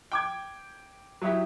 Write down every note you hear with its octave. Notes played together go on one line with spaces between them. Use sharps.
G5 D6 G#6
F#3 D#4 E4 G4